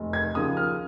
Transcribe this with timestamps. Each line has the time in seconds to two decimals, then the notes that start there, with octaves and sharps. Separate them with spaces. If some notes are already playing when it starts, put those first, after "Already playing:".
Already playing: F1
0.13 G#6
0.35 D#2 C#3 F3 D#6
0.57 F6